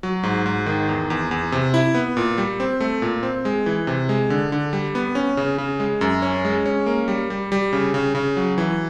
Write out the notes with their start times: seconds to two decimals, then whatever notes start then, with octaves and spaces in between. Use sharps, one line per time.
0.03 F#3
0.23 G#2
0.46 G#2
0.66 D#3
0.89 E2
1.10 E2
1.31 E2
1.52 C3
1.74 E4
1.95 B3
2.17 A#2
2.38 G3
2.60 C4
2.80 A3
3.02 A#2
3.23 C4
3.45 G#3
3.66 E3
3.87 C3
4.09 G#3
4.30 D3
4.52 D3
4.73 G3
4.95 B3
5.15 C#4
5.37 C#3
5.58 C#3
5.80 G#3
6.01 F#2
6.22 C#4
6.45 G#3
6.66 C#4
6.86 A#3
7.08 G3
7.30 G3
7.52 G3
7.73 C#3
7.94 C#3
8.15 C#3
8.37 F#3
8.58 E3